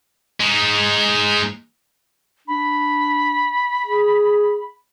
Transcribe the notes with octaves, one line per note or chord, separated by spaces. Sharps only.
G#3 D#4
D4 B5
G#4